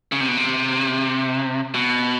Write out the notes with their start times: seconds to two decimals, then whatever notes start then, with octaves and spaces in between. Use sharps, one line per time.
0.12 C#3
0.21 C3
0.28 B2
0.37 C3
1.74 B2